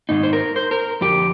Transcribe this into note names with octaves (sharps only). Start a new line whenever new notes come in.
G#2 D#3 G#3 D#4
C5
A#4
C5
A#4
F2 D3 F3 G4